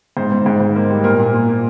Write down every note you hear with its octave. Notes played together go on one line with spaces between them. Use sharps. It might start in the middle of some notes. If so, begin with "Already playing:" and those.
G#2 C5
G#2
G#2
G#2
A#3
G3
A#2 A#4
A#2
A#2
A#2